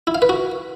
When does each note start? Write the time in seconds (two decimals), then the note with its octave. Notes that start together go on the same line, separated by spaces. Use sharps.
0.07 E4
0.15 F5
0.22 B4
0.29 F#4